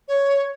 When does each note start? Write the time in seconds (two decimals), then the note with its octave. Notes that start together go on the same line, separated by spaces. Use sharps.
0.08 C#5